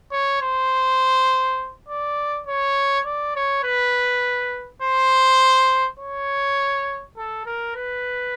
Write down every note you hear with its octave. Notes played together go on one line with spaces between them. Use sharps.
C#5
C5
D5
C#5
D5
C#5
B4
C5
C#5
A4
A#4
B4